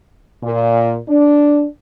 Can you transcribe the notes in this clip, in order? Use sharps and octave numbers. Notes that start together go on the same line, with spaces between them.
A#2
D4